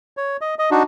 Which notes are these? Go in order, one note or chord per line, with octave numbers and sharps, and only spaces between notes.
C#5
D#5
D#5
D4 D#4 F#4